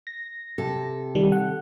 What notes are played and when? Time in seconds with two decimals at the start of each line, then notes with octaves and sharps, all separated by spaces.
0.07 A#6
0.58 C3 A4
1.15 D#3 G3
1.32 F#5